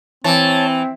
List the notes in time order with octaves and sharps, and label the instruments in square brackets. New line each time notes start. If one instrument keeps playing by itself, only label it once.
[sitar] E3 [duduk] C4 [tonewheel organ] C#5 A5